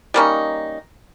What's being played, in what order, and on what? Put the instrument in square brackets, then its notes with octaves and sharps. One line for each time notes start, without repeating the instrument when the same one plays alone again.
[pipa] G3 A#3 C#4 D#4